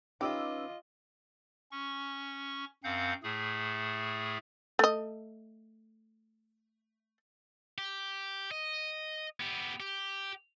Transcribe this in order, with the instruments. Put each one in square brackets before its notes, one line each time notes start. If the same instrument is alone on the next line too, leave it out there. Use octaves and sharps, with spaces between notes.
[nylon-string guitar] C#4 D#4 B4 [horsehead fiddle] F4 D#5 [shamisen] G4 [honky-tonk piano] D6 E6
[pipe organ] C#4 C#6
F#2 C4 F5 F#5 G6
A2 A3 G#4
[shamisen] A3 D#5
[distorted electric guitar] G4
D#5
B3 G4
G4